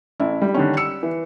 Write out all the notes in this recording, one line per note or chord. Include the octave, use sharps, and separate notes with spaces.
A1 E4
G3
D3 D#3 C#4
E6 C#7
E3